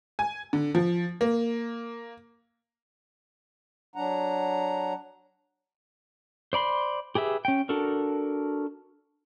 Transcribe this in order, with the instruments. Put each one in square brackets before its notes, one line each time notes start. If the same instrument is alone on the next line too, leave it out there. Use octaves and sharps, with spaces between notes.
[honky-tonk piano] G#5
D3
F3
A#3
[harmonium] F#3 D4 F#5 A#5
[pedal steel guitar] C5 D5 B5 C6
G4 G#4 B4 E5
C#4 G5
D4 F#4 A4 A#4